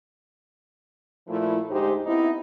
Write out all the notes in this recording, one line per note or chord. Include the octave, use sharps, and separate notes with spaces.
A#2 F3 A3 E4
D2 G#2 G#3 D#4 G4 C5
B3 C4 D#4 E4